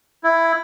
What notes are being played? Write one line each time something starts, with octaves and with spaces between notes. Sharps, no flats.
E4